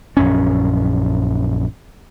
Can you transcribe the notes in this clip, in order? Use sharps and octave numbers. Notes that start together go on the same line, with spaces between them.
A#1 F#2 C#4